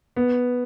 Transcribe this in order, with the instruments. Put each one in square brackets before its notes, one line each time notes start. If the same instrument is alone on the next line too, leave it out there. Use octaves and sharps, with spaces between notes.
[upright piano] B3